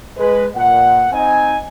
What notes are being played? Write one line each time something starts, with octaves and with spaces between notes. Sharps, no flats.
G#3 B4
A#2 F#5
C4 D#4 D#5 G#5